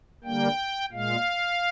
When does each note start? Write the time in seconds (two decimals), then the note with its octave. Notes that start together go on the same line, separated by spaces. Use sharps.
0.24 D3 G3 A#3 G5
0.92 A#2 G#3 F5